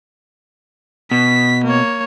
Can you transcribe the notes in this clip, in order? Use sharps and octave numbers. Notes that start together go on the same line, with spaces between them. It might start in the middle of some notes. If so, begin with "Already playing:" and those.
B2 B6
A#3 C#5